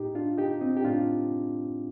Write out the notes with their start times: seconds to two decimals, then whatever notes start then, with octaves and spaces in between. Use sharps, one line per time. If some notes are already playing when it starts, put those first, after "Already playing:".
Already playing: A2 D#4 G4
0.15 D4 F4
0.38 D#4 G4
0.61 C4 D#4
0.77 G4
0.84 A2 D4 F4